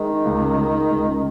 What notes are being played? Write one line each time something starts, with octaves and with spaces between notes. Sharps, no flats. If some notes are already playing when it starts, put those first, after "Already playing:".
Already playing: D#3 G#3
D#4
C#2
C#3
G#3
D#4
C#2
C#3